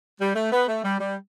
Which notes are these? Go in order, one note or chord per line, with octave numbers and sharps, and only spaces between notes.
G3
A3
B3
A3
G3
G3